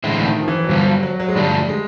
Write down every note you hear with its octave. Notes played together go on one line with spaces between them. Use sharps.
A2 D3 E3 G#3 C4 E4
D3
D#3
F3
E3
F#3
G2 D3 F3 G3
F#3
F#3
F#3
G#3
G2 D3 F3 G3 A3 D4
G#3